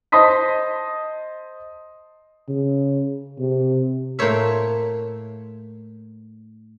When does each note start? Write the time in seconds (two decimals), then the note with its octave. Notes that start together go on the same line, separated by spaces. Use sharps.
0.12 C5 D#5 A5 C6 D#6 B6
2.48 C#3
3.39 C3
4.19 A2 A#3 C5 C#5 E5